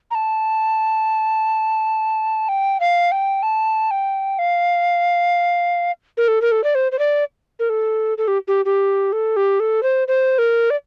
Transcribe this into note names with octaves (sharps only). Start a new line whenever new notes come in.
A#5
A5
G5
F5
G5
A5
G5
F5
A#4
A4
A#4
A4
D5
C5
C5
D5
A#4
A4
A4
G4
G4
G4
A4
G4
A4
C5
C5
A#4
D5